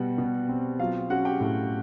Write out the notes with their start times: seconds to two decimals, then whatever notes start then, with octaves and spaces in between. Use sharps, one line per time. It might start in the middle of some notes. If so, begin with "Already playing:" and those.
Already playing: B2 G3 F#4 F#5
0.18 B2
0.49 C4
0.79 F#3 F4 F5
1.10 C#4 F#4 F#5
1.25 G4 G5
1.41 A2